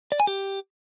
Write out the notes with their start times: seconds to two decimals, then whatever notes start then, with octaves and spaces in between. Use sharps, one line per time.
0.12 D5
0.20 G#5
0.27 G4